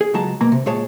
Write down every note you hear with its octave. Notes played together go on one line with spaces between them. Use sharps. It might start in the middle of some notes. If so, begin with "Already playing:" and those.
G#4
C#2 F#3 G#3 F4 A5 A#5
B2 A#3 A#5
C3
A#2 G#3 G#4 C#5 A5